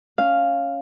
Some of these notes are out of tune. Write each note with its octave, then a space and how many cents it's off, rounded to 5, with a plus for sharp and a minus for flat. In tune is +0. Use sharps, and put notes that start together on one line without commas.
C#4 +0 F5 +0